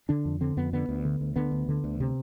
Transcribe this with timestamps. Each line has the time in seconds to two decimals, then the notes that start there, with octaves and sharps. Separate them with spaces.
0.09 D3 D4
0.25 F2
0.41 D3 C4
0.57 F2 B3
0.73 D3 B3
0.89 D2
1.05 D3
1.21 D2
1.36 D3 B3
1.52 D2
1.69 D3
1.84 D2
2.00 C3